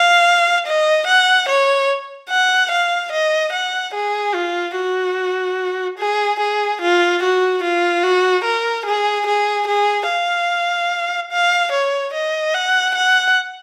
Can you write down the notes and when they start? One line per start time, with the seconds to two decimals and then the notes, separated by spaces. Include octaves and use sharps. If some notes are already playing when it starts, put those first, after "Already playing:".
Already playing: F5
0.67 D#5
1.07 F#5
1.49 C#5
2.29 F#5
2.71 F5
3.12 D#5
3.53 F#5
3.94 G#4
4.34 F4
4.76 F#4
5.98 G#4
6.39 G#4
6.81 F4
7.22 F#4
7.63 F4
8.03 F#4
8.44 A#4
8.86 G#4
9.27 G#4
9.67 G#4
10.09 F5
11.32 F5
11.72 C#5
12.14 D#5
12.54 F#5
12.95 F#5